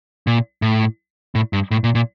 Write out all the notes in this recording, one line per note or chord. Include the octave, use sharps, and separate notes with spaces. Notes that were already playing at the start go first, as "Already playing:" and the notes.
A#2
A2
A2
G2
A2
A#2
A#2